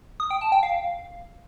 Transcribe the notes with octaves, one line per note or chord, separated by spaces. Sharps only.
D#6
G5
A5
G5
F5